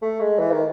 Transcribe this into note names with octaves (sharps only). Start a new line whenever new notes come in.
A3
G#3
E3
D#3